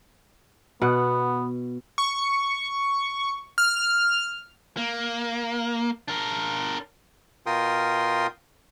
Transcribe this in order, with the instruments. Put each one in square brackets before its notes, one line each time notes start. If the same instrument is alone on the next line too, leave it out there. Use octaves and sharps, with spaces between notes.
[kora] B2 F#5 [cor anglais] B3
[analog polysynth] C#6
F6
[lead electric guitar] A#3
D4 A#4
[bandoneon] B2 F4 A#4 G5 C6 D#6